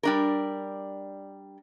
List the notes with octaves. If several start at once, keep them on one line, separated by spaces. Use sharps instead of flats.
G3 D4 A#4